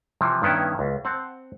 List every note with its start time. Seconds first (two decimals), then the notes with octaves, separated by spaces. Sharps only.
0.21 C3 E3 F3
0.42 G2 D#3 B3 C#4 E4
0.79 C#2
1.05 C4 F#5 A5